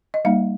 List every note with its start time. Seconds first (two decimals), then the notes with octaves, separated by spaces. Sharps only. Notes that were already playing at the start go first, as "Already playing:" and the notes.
0.14 D#5
0.25 G3 A#3 D#4 F5